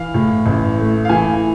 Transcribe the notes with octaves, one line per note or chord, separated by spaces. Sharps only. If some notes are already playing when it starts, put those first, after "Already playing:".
Already playing: E3 F5
A2
A1
A3
F5
E3 G#5